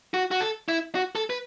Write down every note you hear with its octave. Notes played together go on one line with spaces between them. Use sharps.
F#4
F#4
A4
E4
F#4
A4
B4